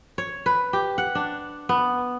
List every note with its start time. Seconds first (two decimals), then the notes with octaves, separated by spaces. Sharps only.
0.18 C#5
0.46 B4
0.73 G4
0.98 F#5
1.15 D4
1.69 B3